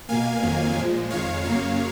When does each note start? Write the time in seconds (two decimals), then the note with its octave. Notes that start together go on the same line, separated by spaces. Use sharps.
0.09 B2 A#3 F5 G#5
0.42 F2 D#3 F#3 A#3
0.76 A#2 F3 G#3
1.10 F2 D#3 G#3 C#5 F5
1.44 F#2 C#3 F#3 A#3 C#5 F5